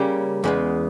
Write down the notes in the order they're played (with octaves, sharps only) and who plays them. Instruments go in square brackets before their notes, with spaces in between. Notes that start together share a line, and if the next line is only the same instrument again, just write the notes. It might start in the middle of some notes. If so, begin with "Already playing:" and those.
Already playing: [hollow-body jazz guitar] C#3 G3 A#3 C#4 G4
E2 C#3 G#3 B3